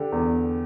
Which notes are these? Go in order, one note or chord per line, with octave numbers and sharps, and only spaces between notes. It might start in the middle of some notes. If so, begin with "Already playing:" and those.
Already playing: D3 G4
E2